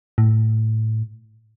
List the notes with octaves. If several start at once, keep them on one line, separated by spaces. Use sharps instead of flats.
A2